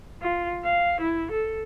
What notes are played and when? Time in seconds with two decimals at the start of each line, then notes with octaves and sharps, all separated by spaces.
0.22 F4
0.65 F5
1.01 E4
1.32 A4